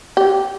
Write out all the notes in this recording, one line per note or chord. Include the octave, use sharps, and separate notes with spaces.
G4